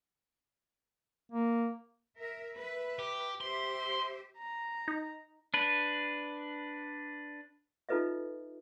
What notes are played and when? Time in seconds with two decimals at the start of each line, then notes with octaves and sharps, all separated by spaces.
1.32 A#3
2.18 A#4 E5
2.58 B4 E5
2.99 G4
3.41 G4 C5 E5 C6
4.38 A#5
4.88 D#4
5.54 D4 B4
7.89 D#4 F4 A4 B4 D#5 E5